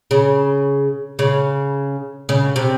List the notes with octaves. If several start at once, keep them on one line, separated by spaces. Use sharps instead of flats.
C#3
C#3
C#3
C3